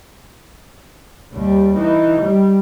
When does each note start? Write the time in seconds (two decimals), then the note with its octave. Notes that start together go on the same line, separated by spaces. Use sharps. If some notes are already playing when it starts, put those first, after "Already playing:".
1.33 D#2 G3
1.76 E3 D#4
2.21 G3